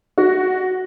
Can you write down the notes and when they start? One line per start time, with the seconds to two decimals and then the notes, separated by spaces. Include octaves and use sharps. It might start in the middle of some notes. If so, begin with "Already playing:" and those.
0.18 F#4